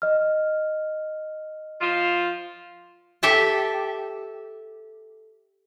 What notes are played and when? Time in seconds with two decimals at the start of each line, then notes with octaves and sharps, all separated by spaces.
0.02 D#5 F6
1.81 F3 F4
3.23 G4 A4 E5 G5 A5